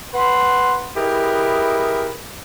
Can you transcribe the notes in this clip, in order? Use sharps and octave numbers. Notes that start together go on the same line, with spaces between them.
B4 F#5 C6
E4 G4 G#4 A#4 B4 D#5